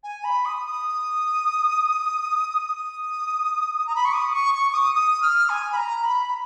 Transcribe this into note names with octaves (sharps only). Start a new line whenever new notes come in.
G#5
B5
D#6
D#6
D#6
A#5
B5
C#6
D#6
C#6
C#6
D#6
D#6
F6
G#5
B5
A#5
B5